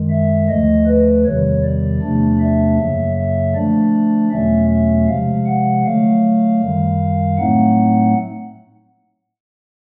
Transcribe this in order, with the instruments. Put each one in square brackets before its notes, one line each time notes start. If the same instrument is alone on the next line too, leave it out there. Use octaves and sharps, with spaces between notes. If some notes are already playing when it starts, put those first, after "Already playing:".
Already playing: [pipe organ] F#2 D#3 G#3
E5
D2 D3 F3 A3 D#5
B4
E2 C3 D#3 G3 C#5
D5
E2 C3 F3 A3 D4
E5
F#2 C#3 F#3 A#3
E5
D3 F3 A3 D4 D5
E2 B2 F#3 A3 C#4 E5
E5
C3 F3 G#3 F5
F#5
D3 F#3 A3 F5
F#2 D#3 G3
A2 F#3 A3 C4 D#4 F#5